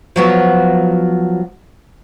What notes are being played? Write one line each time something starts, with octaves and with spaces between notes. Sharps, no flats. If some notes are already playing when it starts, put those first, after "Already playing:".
F3 F#3 B3